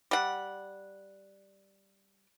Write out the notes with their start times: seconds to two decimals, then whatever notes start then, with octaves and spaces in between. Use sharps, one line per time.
0.11 G3 F#5